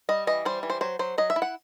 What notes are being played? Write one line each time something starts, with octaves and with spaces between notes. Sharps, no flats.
G3 D#5
E3 D#5
G3 C5
E3
C5
F#3 C5
F#3 C5
F#3 D#5
E5
E4
F#5